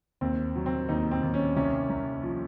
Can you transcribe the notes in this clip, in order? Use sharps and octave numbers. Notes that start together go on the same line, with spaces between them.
D#2 C4
F#3
C4
D#2 D#4
C4
D#2
C#4
C2 C#4
C2
F3